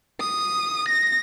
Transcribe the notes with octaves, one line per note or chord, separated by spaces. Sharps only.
D#6
A#6